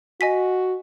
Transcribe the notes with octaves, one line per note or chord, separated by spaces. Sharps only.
F#4 D#5 G#5 B6